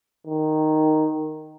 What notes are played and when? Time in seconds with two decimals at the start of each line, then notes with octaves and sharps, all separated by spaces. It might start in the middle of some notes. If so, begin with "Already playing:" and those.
0.27 D#3